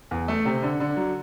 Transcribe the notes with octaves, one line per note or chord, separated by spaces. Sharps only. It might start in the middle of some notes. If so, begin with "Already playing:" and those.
E2
A3
C3
D3
D3
F#3